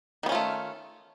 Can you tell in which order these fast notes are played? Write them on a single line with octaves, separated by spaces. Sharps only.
D#3 B3 C#4 F4 A3